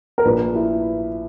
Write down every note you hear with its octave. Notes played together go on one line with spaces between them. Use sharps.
A#4
A#1 B4
E4